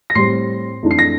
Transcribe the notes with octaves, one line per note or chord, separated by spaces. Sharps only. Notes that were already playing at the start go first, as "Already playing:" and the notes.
A#6
A2 G3 C4 C6 C7
F2 E3 A3 D4
C7
A#6